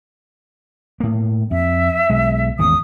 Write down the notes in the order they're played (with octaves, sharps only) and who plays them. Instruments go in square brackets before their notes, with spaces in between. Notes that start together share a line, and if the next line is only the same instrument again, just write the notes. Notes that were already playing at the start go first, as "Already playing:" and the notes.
[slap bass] A2 A#3
[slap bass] F2 [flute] E5
[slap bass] B1 G#3
[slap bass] G#1 E2 C#3 [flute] D#6